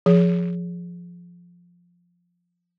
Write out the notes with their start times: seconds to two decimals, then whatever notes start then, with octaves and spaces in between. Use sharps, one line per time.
0.06 F3 G#4